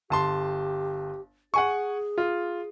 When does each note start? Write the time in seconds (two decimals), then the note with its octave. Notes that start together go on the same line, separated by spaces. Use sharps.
0.10 G1 G4 A5 C6
1.54 G#4 F#5 G#5 C#6
2.18 F4